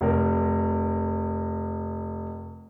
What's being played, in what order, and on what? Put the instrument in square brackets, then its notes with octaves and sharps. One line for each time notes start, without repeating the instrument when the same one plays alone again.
[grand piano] F1 A#4